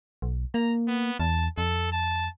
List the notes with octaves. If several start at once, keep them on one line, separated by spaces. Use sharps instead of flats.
B1
A#3 A#5
B3
E2 A5
F2 A4
A5